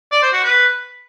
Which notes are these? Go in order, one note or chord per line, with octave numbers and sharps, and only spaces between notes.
D5
C5
F#4
B4